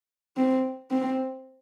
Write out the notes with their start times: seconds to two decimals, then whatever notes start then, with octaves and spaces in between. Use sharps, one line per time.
0.37 C4
0.91 C4